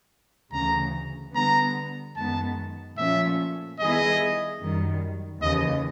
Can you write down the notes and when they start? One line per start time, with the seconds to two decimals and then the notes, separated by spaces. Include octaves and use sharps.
0.52 D2 C#3 E3 A#5
1.34 D3 G3 B3 A#5
2.16 F#2 D#3 G#3 B3 A5
2.97 A#2 F3 A3 C#4 F4 E5
3.79 D#3 G3 B3 E4 G#4 D#5
4.61 F#2 D#3 G3
5.42 D#2 C#3 E3 D#5